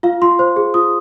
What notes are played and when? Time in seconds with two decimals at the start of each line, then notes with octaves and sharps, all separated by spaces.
0.03 F4 F5
0.22 F4 C6
0.39 C5
0.56 G#4
0.74 F4 D#6